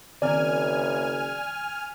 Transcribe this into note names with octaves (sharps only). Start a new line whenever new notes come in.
F#1 D#3 C4 D5 G#5 F6